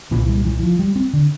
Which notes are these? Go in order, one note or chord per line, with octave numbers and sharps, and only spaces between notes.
C2 A#2 E3
G3
E3
F3
G3
C4
D3